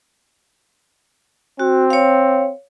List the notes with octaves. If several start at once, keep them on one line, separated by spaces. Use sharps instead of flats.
C4 F#4
C#5 F5